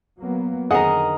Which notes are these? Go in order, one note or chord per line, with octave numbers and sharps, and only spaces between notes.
F#3 A#3 B3
F2 D3 D#3 G#4 A#4 D#5 F#5